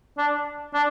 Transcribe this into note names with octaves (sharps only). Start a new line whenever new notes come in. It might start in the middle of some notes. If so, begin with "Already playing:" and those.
D4
D4